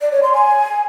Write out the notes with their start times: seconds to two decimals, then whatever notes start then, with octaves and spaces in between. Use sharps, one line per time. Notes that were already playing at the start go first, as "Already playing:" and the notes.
0.01 D5
0.12 C#5
0.23 C6
0.34 G#5